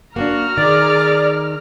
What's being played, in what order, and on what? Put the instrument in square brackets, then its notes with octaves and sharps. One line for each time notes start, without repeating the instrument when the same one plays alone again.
[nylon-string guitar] A#3 C4 D4 [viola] F#4 [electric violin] A#5 F6
[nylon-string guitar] D#3 [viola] G#4 D6 [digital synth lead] D5